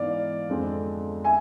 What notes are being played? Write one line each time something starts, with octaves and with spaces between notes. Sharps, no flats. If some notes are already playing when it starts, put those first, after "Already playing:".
Already playing: G#2 E3 B3 D5 F5
F2 D3 G#3 C4
E5 G#5